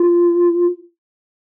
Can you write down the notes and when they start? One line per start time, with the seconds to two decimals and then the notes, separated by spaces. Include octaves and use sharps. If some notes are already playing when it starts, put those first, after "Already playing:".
Already playing: F4